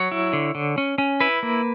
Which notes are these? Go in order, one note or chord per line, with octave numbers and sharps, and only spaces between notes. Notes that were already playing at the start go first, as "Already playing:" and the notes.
Already playing: F#3 C#5
E4
D3
D3
C#4
C#4
E4 B4
A#3